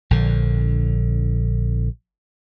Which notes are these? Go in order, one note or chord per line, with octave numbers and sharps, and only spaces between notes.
A#1 D3